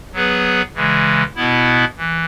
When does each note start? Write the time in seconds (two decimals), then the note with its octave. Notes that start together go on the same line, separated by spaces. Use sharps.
0.13 F#3 B3 G#4 B4
0.74 C#3 E3 G#3
1.36 B2 B3 E4
1.97 E3